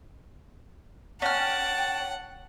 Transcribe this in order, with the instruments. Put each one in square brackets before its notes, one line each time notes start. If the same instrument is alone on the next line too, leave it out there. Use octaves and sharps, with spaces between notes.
[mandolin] C#4 F6 [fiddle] F#5 [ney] G5 [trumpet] A5